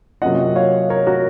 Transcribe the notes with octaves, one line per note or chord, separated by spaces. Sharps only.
C3 F#3 A#3 C#4 F4 D#5 F#5
C#5 F5
A#4 C#5
F#4 A#4